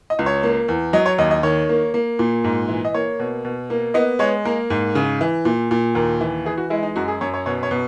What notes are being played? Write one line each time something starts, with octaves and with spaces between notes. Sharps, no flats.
D#5
C#2
C#5
A#3
E2
F#3 D#5
C#5
D#2 D#5
D#5
D#3 C#5
A#3
A#3
A#2
G#2
E3
D#5
A#3 C#5
B2
B2
A#3
B3 D#5
G#3 C#5
A#3 A#4
G#2
C#3
E3
A#2
A#2
D#2 A#4
E3
E3 G#4
F#4
G#3 E4
D#4
F#2 F#4
G#4
F#2 C#5
C#5
B2 C#5
C#5
B2